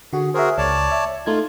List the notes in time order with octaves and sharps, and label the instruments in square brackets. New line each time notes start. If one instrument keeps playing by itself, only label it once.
[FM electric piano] D3 F#4 [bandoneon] G#4
[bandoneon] F#4 G#4 A#4 [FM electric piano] C5 E5
[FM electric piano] C#2 [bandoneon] C#5 D5 A5
[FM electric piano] E5
[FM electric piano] A3 D#4 G#6 [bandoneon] F4